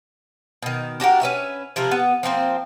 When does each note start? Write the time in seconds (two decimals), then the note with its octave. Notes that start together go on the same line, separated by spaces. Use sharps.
0.63 B2 D#3
1.00 D4 F#4 G4 A#4
1.21 C#4 B4 E5
1.76 C3 F3 E4 A#4
1.91 B3
2.23 F3 A#3 C4 C5